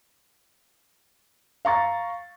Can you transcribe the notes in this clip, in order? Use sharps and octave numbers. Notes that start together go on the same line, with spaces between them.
F5 A#5 C#6 A6